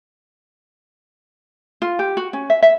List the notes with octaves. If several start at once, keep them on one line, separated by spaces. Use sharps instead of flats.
F4
G4
F#4
C#4
E5
E5